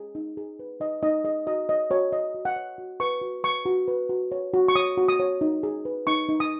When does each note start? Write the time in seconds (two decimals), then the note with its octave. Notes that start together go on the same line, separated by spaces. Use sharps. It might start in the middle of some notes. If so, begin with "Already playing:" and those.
Already playing: G#4
0.15 D#4
0.37 G#4
0.59 B4
0.80 D#4 D#5
1.03 D#4 D#5
1.24 G#4 D#5
1.46 F#4 D#5
1.69 C#5 D#5
1.90 F#4 C#5
2.12 C#5 D#5
2.34 F#4
2.45 F#5
2.56 C#5
2.78 F#4
3.00 B4 C#6
3.22 F#4
3.44 B4 C#6
3.66 F#4
3.88 B4
4.09 F#4
4.32 C#5
4.54 F#4
4.68 C#6
4.75 C#5 D#6
4.97 F#4
5.08 D#6
5.20 C#5
5.41 D#4
5.63 G#4
5.85 B4
6.07 D#4 C#6
6.29 D#4
6.40 D#6